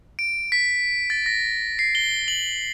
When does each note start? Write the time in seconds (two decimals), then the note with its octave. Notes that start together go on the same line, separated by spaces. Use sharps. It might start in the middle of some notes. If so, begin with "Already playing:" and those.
0.19 D7
0.52 B6
1.10 A6
1.26 A#6
1.79 C7
1.95 G7
2.28 F#7